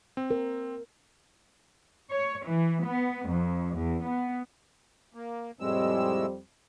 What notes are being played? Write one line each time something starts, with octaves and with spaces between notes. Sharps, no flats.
C4
A#4
C#5
E3
B3
F2
E2
B3
A#3
F2 A2 G3 G#3 C4 E6